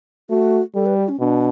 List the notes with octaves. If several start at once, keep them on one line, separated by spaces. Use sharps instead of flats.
A3 F#4
G3 A4
B4
G4
C#4
B2 D4